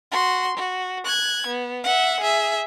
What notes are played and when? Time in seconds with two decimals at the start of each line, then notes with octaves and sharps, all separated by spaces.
0.11 F#4 C6
0.57 F#4
1.05 F#6 G#6
1.47 B3
1.84 E5 F#5
2.20 G#4 E5